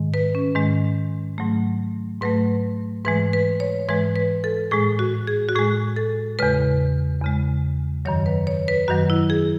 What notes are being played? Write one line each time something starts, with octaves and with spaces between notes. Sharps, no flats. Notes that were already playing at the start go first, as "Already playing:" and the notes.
Already playing: G#2 D#3 G#3
B4
C#4
G#2 D#3 G#3
G#2 F#3 A3
G#2 F#3 A3 B4
G#2 E3 G#3 B4
B4
C#5
G#2 E3 G#3 B4
B4
A4
A2 G#3 G#4
F#4
G#4
F#4
A2 G#3 G#4
A4
E2 C#3 G#3 B4
E2 C#3 G#3
F#2 D#3 F#3 C#5
B4
C#5
B4
F#2 D#3 F#3 F#4
E4
G#4